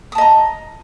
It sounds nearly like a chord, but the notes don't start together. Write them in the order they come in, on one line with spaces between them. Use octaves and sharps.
D#6 A5 D#5 A#5